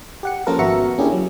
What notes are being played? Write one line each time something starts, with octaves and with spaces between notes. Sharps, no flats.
G4 F#5 C#7
F3 A#3 C#4 F4 A4 A#4
G#1 B3 F#4 E5 A#5 C#7
A1
A#3 C#4 D4 E4 G4 G#4
F#3